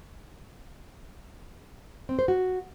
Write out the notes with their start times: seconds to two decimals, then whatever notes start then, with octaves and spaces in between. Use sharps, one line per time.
2.09 C4
2.19 C5
2.28 F#4